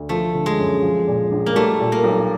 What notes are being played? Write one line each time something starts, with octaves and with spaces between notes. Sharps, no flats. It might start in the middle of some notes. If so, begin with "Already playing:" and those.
Already playing: D2
F3 A3
D3
G#3
F#2
F3
A#2
A#1
A#3
G3 A3
A#2
A#3
B1